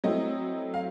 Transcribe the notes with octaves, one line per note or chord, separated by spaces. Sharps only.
F#3 A3 C4 E4 D#5
F5